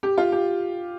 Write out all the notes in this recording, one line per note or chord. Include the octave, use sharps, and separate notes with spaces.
G4
F4
G4